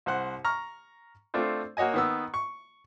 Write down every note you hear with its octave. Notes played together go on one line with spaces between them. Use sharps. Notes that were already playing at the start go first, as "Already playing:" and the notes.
C2 C5 F#5 F#6
A#5 C#6 F6
A3 C4 D4 F4 C5
A#3 F#4 C#5 D#5 G#5
D#3 B3 E6
C#6